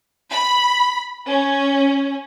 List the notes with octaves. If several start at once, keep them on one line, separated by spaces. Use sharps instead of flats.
B5
C#4